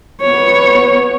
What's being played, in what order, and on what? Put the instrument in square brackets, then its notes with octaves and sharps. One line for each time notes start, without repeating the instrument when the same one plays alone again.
[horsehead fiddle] B3 C#5